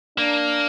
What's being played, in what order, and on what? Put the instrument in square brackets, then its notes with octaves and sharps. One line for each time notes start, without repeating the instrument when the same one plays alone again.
[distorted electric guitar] A#3 [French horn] D4